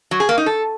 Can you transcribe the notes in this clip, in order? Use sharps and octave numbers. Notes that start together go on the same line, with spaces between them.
F#3
G#4
A#3
D#4
A4